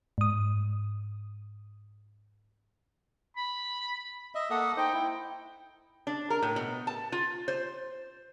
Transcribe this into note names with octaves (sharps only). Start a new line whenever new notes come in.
G#2 D#6
B5
D#5 E5
A#3 A4 F#5 D#6
D#4 C5 D#5 G5
E4
D4
A#4
A2
B2
A5
F4
C5